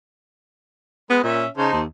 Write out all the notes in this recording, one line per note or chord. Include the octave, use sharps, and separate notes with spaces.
G#3 B3 B4
A#2 C#4 E5
C#3 D#4 C5 A5
D#2